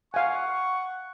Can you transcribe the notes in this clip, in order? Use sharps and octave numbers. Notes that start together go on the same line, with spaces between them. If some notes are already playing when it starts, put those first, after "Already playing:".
F5 F#5 G#5 C#6